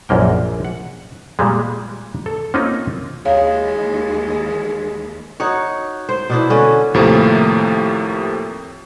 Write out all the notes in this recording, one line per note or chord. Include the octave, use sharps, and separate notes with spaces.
A#1 F#2 A#3 G5
F#5
A#2 G3 G#3
A4
A#3 C4 C#4 D#4 F4
D#2 E3 G#3 C#5 F5
D#4 F#4 C#5
C5
B2 D4 E4
D3 C#4
D#2 A2 C3 F3 A3 A#3